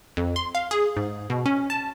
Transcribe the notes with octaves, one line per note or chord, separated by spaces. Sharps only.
F2
C6
F5
G#4
G#2
B2
C#4
A5